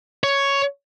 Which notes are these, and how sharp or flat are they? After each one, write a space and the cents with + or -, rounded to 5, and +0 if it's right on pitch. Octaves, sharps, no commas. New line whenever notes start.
C#5 +5